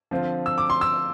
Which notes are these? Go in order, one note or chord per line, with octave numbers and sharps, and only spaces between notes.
D3 F3 C4 F4
E6
D6
C6
E6